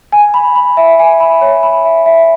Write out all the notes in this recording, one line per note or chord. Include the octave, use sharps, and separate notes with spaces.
G#5
B5
B5
E5
G#5
B5
C#5
B5
E5
E5